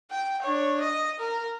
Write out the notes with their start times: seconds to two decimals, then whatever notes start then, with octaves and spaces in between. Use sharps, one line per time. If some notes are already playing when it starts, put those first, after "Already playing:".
0.10 G5
0.42 D4 C#5
0.81 D#5
1.19 A#4